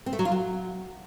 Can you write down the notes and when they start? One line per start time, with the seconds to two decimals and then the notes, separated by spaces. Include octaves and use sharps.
0.06 C4
0.13 A3
0.19 F#3
0.25 F4
0.32 F#3